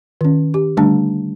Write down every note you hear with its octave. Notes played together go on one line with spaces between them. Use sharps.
D#3 C#4
G4
D3 G3 A3 D4 A5